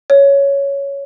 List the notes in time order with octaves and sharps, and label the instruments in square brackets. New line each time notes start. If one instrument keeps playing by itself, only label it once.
[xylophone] C#5